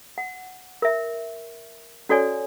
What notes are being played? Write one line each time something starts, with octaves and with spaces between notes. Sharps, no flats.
F#5
A#4 E5
C#4 F#4 A4 C#5 D5 G#5